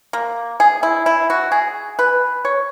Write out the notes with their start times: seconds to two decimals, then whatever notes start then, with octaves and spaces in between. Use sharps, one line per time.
0.13 A#3
0.60 G#4
0.83 E4
1.06 E4
1.30 F#4
1.52 G#4
1.99 B4
2.45 C#5